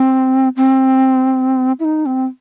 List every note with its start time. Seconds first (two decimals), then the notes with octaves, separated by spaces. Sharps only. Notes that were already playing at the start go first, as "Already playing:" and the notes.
Already playing: C4
0.57 C4
1.80 E4
1.85 D#4
2.06 C4